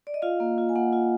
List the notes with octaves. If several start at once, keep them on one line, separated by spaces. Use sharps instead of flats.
D5
D#5
F4 F5
A#3
F4
G#5
A#3 F#5
F4